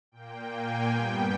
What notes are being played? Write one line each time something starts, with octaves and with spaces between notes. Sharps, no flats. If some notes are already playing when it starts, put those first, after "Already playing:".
A#2 A#3 G5
G#5
G2 G3 B3 G5